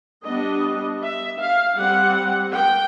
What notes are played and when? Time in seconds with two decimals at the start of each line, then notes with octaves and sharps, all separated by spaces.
0.24 G3 B3 D4 D#5
1.02 E5
1.40 F5
1.78 G3 C4 F#5
2.54 G5